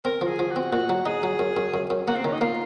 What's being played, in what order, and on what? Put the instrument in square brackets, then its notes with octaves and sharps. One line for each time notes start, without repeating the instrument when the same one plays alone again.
[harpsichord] C4 [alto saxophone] A#4
[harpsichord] F3
[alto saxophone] G#4
[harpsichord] F3
[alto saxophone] F#4
[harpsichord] C4
[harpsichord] A#2 [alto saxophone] F#4
[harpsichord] F#3
[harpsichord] D#4 [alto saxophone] G#4
[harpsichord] F#3
F#2
F#2
F#2
F#2
[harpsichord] A#3 [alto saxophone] F#4
[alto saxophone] C4
[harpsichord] D#3 [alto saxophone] C#4
[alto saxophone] D#4
[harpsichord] A#3 [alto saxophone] F4